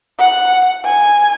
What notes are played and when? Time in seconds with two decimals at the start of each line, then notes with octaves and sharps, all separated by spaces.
0.20 F#5
0.85 G#5